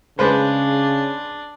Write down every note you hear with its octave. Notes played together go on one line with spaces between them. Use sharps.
C#3 G#3 D4 B4 C5